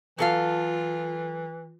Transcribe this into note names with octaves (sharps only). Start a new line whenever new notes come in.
E3 F#3 F4 A4 F5